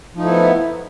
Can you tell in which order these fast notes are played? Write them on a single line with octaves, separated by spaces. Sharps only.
F3 D#4 A3 E4 B3